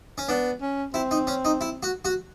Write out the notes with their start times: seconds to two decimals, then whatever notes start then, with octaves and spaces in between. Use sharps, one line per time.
0.18 C#4
0.29 B3 D4
0.62 C#4
0.94 C4 E4
1.11 D#4
1.27 C#4
1.45 D#4
1.61 E4
1.83 F#4
2.05 F#4